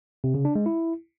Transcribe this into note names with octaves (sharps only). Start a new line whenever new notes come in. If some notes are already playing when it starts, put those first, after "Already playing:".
C3
C#3
D4
G#3
E4